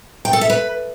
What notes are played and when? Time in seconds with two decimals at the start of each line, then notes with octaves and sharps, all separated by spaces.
0.25 G5
0.33 A4
0.41 E5
0.50 B4